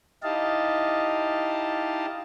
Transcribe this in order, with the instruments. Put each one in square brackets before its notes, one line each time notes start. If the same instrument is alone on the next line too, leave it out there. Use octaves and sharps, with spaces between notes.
[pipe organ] D#4 E4 G4 D#5 F5 A5